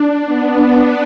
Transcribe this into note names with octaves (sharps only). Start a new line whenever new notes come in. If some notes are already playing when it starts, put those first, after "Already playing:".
Already playing: D4
B3